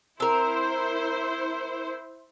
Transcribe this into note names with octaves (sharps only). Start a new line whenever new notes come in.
C4 E4 A#4 C5